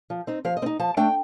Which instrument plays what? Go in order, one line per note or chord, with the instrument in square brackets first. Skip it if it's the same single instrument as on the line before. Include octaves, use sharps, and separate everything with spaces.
[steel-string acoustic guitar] F3
C4 D#4
F3 F5
D#5
C4
D#4
F3 A5
A3 D4 G5